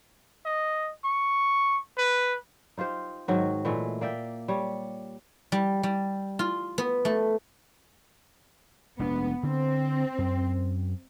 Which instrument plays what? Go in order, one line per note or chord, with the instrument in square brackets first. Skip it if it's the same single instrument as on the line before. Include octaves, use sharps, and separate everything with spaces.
[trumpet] D#5
C#6
B4
[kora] D#4 F4 G4 C5
G#2 D#3 F#3 F#4
A#2 E3 G#3 A3
A#3 D5 E5 G5
G3 C#5
[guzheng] G3
G3
F4
B3
A3
[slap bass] F1 G#3 D4 [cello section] B3
[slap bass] D3 [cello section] C4
[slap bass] F#2